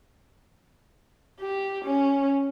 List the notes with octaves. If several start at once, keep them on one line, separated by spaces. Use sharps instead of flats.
G4
C#4